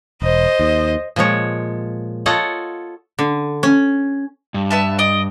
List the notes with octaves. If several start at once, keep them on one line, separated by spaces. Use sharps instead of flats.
E1 C5 D#5
D#2
A#2 F3 G#3 C#5
F4 A4 C#5 D#5 F#5
D3
C#4
G2
B3 E5 A5
D5 D#5